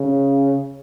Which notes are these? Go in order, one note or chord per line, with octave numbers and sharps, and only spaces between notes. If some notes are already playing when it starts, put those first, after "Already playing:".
Already playing: C#3